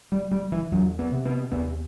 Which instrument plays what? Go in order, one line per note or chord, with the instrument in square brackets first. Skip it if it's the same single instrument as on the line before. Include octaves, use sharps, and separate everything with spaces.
[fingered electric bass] G3
G3
E3
E2 F#3
B3
C3
B3
D#2 B3